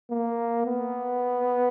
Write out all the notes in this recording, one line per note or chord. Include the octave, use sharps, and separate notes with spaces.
A#3
B3